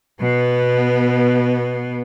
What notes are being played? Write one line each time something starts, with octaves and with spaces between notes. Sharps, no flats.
B2 B3